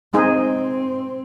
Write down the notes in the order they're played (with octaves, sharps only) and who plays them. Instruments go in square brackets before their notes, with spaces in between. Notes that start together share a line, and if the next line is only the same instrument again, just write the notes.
[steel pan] G#3 D#4 G#4 [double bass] C4